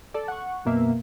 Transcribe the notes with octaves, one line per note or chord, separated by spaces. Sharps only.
A4 D5
F#5 C#6
F#2 B2 A#3 E5